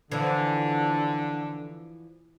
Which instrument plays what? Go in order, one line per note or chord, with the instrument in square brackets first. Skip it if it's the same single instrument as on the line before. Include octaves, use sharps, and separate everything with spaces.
[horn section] D3 [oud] E3 F3